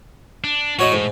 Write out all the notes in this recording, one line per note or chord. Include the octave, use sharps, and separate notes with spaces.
D4
A2 F#4 C#5 D#5
G#2